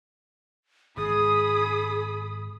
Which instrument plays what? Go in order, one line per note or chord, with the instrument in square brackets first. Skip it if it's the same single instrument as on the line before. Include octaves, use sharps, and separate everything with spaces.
[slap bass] G#1 G#2 [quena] G#4 [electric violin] B5 D#6